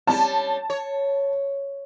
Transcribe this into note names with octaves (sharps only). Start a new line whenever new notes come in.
G3 C#4 A5
C#5